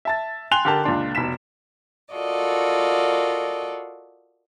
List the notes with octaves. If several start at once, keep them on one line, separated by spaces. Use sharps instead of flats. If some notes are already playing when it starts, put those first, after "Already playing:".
E5 A5 A6
G5 G#5 C6 F#6 F7 G7
D3 G4 A#4 A5
C#2 A#2 D4 C6
F1 B2 B6 E7
F4 F#4 A4 A#4 D5 D#5